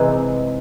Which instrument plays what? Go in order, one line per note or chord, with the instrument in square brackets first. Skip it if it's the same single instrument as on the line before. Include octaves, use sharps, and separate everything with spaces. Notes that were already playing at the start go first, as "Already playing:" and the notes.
Already playing: [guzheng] C3 E3 G#3 D#4